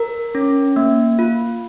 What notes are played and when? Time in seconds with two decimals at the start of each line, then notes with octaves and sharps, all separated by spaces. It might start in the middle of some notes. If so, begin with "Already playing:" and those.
Already playing: A#4
0.35 C#4
0.76 A#3
1.19 F4